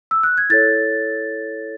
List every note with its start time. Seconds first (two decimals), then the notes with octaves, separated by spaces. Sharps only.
0.11 E6
0.23 F#6
0.38 G#6
0.50 E4 A4 C#5 A6